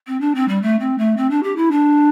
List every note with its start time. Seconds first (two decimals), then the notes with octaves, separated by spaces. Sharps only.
0.07 C4
0.20 D4
0.35 C4
0.48 G3
0.62 A3
0.79 C4
0.98 A3
1.17 C4
1.30 D4
1.43 G4
1.56 E4
1.71 D4